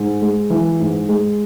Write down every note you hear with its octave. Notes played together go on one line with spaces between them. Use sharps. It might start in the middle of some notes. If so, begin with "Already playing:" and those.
Already playing: G#2
G#3
E3
G#2
G#3